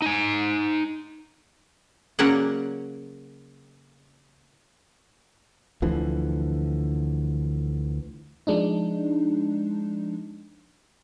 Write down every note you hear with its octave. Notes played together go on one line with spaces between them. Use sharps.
D#4 G#5
C#3 F#3 A#3 C#4 D5 F#5
D2 D3 E3 F3
F3 G#3 D4 D#4